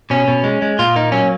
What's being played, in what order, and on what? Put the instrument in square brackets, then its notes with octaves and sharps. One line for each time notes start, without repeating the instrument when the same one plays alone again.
[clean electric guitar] B2 C#4
B2
G#3
G#3
A#2 F4
A#3 D#4
F#3 C#4